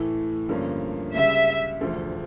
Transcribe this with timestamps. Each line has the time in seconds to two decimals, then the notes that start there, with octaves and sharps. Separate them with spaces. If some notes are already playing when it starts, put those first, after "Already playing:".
Already playing: A2 E3 A3
0.49 G2 D3 F3 A#3 C#4
1.14 C#2 C#3 G3 E5
1.80 E1 D2 D3 F3